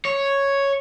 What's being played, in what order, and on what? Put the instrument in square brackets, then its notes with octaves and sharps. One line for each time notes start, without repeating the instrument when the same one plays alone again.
[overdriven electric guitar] C#5